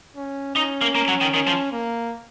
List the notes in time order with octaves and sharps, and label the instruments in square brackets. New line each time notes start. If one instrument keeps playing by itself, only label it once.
[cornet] C#4
[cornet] C#4 [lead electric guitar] D#4
[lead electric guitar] A#3
A#3
F#3
D#3
[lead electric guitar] D#3 [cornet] C#4
[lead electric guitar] F3
[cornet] A#3